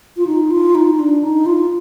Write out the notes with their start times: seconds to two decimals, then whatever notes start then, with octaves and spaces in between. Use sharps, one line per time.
0.17 F4
0.27 D#4
0.51 F4
0.75 D#4
0.99 D4
1.23 D#4
1.46 F4